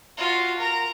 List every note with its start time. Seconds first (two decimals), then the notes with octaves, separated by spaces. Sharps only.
0.18 F4 F#4
0.57 A#4 A#5